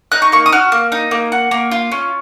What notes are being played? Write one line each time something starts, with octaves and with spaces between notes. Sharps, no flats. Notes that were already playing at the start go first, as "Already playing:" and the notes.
D#4 F#6
C#6
A#3 C#6
D#6
F#4 F6
A#3
D#4
A#3
F#4
A#3
F4
C#4